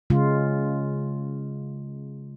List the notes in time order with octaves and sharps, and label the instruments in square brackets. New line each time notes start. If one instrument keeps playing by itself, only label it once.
[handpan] C#3 G#3 F4